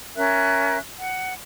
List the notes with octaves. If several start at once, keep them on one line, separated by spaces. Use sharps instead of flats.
C#4 A#4 E5 F#6
F#5